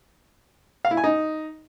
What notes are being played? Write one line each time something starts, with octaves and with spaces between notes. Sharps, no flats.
F5
E4
G#5
D#4